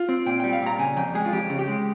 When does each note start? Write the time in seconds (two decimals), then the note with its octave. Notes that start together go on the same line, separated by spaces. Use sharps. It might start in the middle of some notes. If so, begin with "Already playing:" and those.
Already playing: F4
0.09 C4
0.26 A#2 G5
0.40 G3 G5
0.53 F5
0.62 A#2 A#5
0.79 C#3 G#5
0.97 F2 G5
1.15 G#3 G#4
1.26 F4
1.32 F2 G4
1.50 C#3
1.59 G4
1.68 G#3